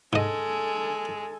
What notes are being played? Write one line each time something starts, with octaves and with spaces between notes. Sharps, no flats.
G#2 G#3 A4 D#5 G#5